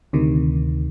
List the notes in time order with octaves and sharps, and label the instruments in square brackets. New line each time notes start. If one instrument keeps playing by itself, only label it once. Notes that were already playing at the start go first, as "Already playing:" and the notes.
[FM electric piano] D2 C3 D#3